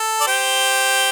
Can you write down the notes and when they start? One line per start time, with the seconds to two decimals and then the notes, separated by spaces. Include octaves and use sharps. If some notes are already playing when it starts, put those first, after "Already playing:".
Already playing: A4
0.21 D5
0.27 G4 C5